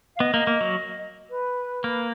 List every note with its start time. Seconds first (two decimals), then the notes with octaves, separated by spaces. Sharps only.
0.15 F5
0.20 B3 D#5
0.34 A#3
0.47 A#3
0.61 F#3
1.29 B4
1.84 A#3